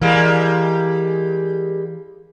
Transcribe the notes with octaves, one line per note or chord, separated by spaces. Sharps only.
E3 G3 G#3 A#3